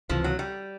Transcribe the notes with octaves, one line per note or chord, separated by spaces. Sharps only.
C#2 C3 E3 F3
F#3
G3